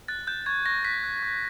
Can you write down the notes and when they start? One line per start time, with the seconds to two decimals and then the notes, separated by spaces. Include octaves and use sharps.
0.08 F#6 A6
0.27 F#6 G6
0.46 C#6 G#6
0.66 C#6 A#6
0.85 F#6 B6
1.04 F#6
1.23 C#6